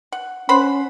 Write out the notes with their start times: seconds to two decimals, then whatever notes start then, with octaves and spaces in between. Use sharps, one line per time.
0.12 F#5
0.49 C#4 C5 F#5 B5